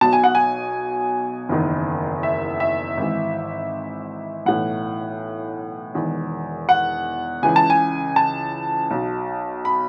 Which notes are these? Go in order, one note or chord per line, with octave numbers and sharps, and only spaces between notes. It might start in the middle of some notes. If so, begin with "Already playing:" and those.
B1 B2 A5
G#5
F#5
G#5
F#1 E2 D#3
E5
E5
G#1 G#2 E3
B1 A2 E3 F#5
E1 E2 D#3
F#5
C#2 C#3 E3 G#5
A5
G#5
A5
B1 B2
B5